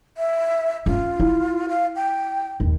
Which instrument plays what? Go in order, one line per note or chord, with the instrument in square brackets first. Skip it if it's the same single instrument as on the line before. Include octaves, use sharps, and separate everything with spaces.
[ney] E5
[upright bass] C#4 [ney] F4
[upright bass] E4
[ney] F5
G5
[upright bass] D#2